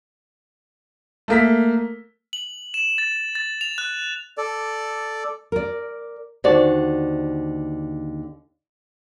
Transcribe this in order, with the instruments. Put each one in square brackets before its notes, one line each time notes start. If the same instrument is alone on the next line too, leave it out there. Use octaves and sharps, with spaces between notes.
[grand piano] A3 A#3 B6
[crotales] F#7
E7
A6
A6
F7
F#6
[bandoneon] A4 D5
[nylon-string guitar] A#4 D5
D#2 D3 F#4 C5 D5